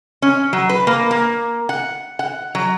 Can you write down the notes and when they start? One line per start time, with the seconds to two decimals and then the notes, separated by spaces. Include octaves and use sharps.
0.22 C#4
0.53 F#3
0.69 B4
0.87 A#3
1.11 A#3
1.69 F#5
2.19 F#5
2.55 F#3